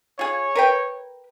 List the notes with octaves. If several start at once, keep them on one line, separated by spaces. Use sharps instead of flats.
F4 G#4 C#5
A#4 B4 G5